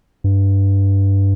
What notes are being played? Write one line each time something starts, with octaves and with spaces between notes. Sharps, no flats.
G2